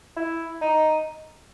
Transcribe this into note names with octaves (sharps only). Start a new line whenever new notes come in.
E4
D#4